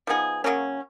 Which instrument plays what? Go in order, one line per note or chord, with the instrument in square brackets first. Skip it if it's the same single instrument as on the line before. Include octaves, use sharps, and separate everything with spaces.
[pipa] F3 B3 D#4 G#4
C#3 F#3 A#3 C#4